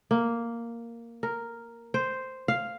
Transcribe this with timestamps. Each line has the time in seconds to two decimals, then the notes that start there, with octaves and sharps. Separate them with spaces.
0.11 A#3
1.23 A#4
1.94 C5
2.48 F5